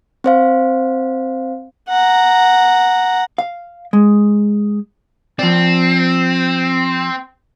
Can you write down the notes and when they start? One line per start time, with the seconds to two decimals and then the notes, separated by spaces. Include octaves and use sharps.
0.24 C4 C5 F5
1.89 F#5 A#5
3.38 F5
3.93 G#3
5.39 F3 C4 D5